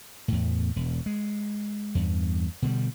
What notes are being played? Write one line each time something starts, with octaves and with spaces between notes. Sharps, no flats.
E2 A2
E1
G#3
E2 G2
B2 D3 E3 G3